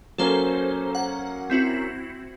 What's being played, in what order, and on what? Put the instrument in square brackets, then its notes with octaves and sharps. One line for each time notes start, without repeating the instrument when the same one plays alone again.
[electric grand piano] F#3 A#3 C#4 [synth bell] A4 C5
[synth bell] F#5
C4 E4 F#4